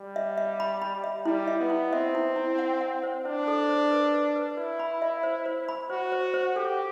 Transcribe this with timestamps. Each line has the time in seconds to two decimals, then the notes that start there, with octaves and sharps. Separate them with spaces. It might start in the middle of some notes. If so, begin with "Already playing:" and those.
Already playing: G3
0.16 E5
0.38 E5
0.60 B5
0.82 B5
1.04 E5
1.25 G3 E4
1.48 E5
1.59 B3
1.70 E4
1.93 C4 E5
2.15 E4
2.36 E4
2.59 F#5
2.81 F#5
3.03 C5
3.25 D4 C5
3.48 A4
3.69 C5
3.91 B4
4.13 B4
4.36 B4
4.57 E4 B4
4.79 B5
5.02 E5
5.23 C5
5.46 C5
5.69 B5
5.90 F#4 C5
6.12 C5
6.34 C5
6.56 G4 A4